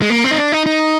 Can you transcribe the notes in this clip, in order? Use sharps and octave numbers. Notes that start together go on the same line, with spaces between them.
G#3
A#3
C4
D#4
D4
D#4
D#4